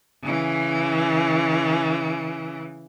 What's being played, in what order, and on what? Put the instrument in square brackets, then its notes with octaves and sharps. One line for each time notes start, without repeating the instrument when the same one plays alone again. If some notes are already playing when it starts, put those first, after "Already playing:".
[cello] C#3 E3